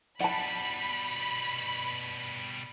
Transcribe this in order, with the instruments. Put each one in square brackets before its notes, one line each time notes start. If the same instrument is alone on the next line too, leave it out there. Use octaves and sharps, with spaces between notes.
[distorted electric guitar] B2 G3 [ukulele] F#5 A5 [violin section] B5